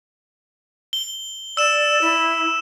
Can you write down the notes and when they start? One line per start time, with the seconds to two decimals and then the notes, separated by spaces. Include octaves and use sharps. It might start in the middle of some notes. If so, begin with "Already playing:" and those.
0.93 G7
1.57 D5 E6 E7
2.01 E4